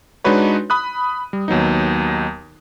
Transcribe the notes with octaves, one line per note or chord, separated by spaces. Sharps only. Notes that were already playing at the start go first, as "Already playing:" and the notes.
G#3 D4 D#4 F#4 B4 C#5
B5 D#6 F#6
G3
D#2 F#3 B3 D#4